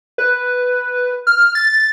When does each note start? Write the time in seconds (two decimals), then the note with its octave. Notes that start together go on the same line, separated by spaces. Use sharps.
0.18 B4
1.27 F6
1.55 A6